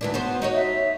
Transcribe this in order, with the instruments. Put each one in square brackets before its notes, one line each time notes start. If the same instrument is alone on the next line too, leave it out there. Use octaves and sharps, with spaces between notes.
[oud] D2 E3 D4
B3 F#4 C5
D#4 F#4 C#5
[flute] E5